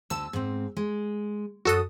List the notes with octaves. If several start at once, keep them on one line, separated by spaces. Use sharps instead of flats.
D2 D3 A5 E6
G#2 C4
G#3
F#2 F#4 A4 D#6